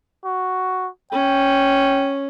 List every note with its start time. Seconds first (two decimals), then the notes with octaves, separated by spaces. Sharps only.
0.25 F#4
1.12 C#4 G5